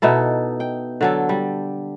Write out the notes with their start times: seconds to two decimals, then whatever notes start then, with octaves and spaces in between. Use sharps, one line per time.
0.02 B2 D#4 E4 A4
0.60 G5
1.01 D3 F#3 A4
1.29 G3